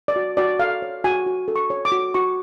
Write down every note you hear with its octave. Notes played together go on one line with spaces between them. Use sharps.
D5
F#4
F#4 D5
A4 F5
C#5
F#4 G#5
F#4
A4
C#6
C#5
D6
F#4
F#4 C#6